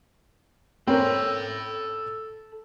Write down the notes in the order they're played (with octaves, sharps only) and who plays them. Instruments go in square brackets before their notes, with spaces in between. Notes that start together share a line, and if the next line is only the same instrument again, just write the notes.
[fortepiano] C4 C#4 A#4 [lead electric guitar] A4 B5